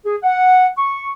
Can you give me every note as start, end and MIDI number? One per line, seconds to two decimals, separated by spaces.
0.05 0.16 68
0.23 0.67 78
0.77 1.11 85